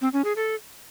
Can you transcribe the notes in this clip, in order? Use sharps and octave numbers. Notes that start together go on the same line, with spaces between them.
C4
C#4
G#4
A4